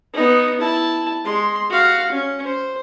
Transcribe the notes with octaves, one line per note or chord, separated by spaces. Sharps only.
B3 D#4
E4 A5
G#3 C6
F#4 F5
C#4
C5